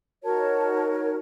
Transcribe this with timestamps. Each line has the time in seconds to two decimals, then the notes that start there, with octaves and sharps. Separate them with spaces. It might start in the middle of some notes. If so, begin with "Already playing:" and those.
0.23 D#4 F#4 A#4 C#5 A5
0.90 C#5